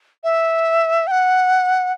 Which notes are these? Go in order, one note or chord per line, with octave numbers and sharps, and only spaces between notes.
E5
G5
F#5